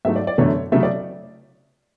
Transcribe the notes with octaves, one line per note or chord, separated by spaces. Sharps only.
G#2 F#3 A3 E5
D5
D5
F#2 D3 F#3 A3 C#5
C#3 F#3 A3 E5
D5